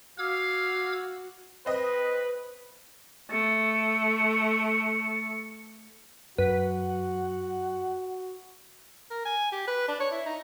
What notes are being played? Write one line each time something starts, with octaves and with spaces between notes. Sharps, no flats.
F#4 F5 D6 E6 G#6
C4 B4 D#5
A3 C#7
F#2 F#4 B4 F#5
A#4
G#5
G4
B4
D4
C#5
E4
D#4